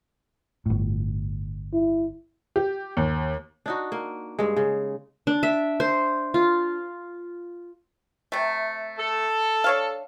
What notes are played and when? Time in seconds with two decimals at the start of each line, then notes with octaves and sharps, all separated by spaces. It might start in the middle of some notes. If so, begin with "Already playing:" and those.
0.66 G1 A2
1.73 E4
2.56 G4
2.97 D#2
3.66 D4 D#4 F#4
3.92 A#3
4.39 G2 G#3
4.56 C#3
5.27 D4
5.43 E5
5.80 C5
6.34 F4
8.32 C3 A3
8.99 A4
9.64 D4 C#5 F5